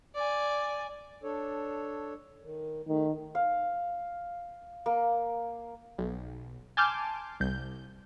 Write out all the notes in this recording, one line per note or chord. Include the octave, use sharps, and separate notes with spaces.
D5 G#5
D4 A4 C#5
D#3
D#3 A3
F5
A#3
B1
G#5 A5 C6 D6 F6 G6
C2 G6